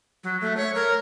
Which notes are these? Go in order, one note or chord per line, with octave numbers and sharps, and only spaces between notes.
F#3
A3
C#5
A#4